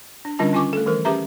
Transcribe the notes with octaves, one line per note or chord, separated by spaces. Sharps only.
D4
D3 G3 C#4 D4 F4 A5
D#3 C#4 F4 G#5 C#6 D6
A3 A4
D#3 E3 G3 A#4
C#4 G4 G#4 B4 E5 A#5